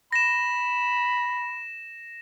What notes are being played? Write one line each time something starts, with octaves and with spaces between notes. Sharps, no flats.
B5 A#6 E7